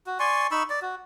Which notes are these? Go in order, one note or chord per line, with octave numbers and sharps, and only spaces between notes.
F#4
D5 G#5 C6 C#6
D#4 B5 C#6 E6
D5
F#4